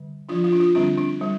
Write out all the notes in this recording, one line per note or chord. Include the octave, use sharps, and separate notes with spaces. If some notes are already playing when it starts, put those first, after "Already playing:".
Already playing: D3 G3
F3 D4 F4
F4
D4
F4
D3 G3 C4 D4
D4
G3